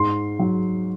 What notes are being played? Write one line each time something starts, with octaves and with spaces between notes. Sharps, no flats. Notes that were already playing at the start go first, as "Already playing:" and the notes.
Already playing: G#2 C6
F#3